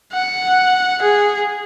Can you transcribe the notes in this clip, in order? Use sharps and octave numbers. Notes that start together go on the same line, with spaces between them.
F#5
G#4